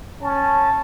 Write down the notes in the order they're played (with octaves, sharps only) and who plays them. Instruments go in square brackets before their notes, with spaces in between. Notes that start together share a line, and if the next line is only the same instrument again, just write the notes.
[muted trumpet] C#4 [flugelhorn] A5